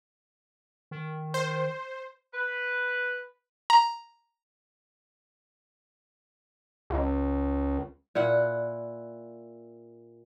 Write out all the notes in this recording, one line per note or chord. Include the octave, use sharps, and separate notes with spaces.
D#3
C5
B4
A#5
C#2
A#2 E4 F#5